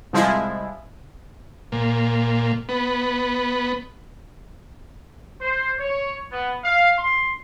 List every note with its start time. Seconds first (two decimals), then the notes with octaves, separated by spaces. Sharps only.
0.13 C2 F3 G#3 E4
1.72 A#2
2.69 B3
5.41 C5
5.79 C#5
6.32 B3
6.64 F5
6.98 C6